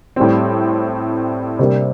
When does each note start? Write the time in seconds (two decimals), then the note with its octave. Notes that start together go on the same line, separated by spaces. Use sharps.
0.16 A2 G3 C4
1.59 C3 G3 A#3 D4